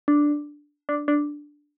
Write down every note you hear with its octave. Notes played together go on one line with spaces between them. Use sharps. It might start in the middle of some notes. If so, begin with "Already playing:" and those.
D4
D4
D4